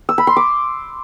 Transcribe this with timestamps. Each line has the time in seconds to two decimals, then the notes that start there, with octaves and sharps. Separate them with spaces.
0.09 E6
0.18 B5
0.27 C6
0.36 D6